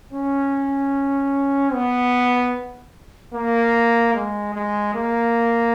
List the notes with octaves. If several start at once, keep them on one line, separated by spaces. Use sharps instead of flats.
C#4
B3
A#3
G#3
G#3
A#3